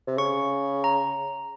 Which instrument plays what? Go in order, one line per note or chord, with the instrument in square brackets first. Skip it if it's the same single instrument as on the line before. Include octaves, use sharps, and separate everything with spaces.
[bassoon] C3
[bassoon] C#3 [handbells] C#6
[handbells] A#5